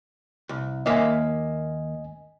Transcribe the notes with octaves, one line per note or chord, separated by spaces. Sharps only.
C2
D#2 A#3 D#5 E5 G#5